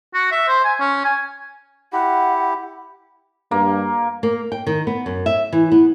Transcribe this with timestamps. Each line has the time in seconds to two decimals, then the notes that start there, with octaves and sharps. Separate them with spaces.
0.14 F#4
0.31 E5
0.48 C5
0.64 G#5
0.80 C#4
1.05 G#5
1.93 E4 G4 F#5
3.51 G2 A#3
4.23 A#3
4.52 G5
4.67 D#3
4.87 B3
5.06 F#2
5.26 E5
5.52 E3
5.72 B3